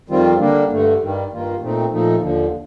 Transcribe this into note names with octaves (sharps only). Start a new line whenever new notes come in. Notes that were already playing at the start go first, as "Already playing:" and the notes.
F2 D#3 G3 C4 F4
D3 G3 A#3 D4
G2 D3 A3
G2 D#3 G3
G2 D#3 A#3 F4
A#2 A3 C4 D#4
A#2 F3 A3 D#4
D#2 D3 F3